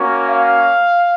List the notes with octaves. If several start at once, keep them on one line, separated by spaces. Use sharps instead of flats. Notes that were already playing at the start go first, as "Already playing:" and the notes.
Already playing: A#3 C#4 F#4
F5